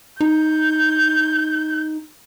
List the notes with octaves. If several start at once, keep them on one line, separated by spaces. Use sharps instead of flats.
D#4 G6